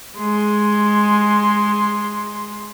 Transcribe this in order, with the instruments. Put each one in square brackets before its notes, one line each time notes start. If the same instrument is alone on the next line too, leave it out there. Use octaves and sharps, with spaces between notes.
[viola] G#3 C6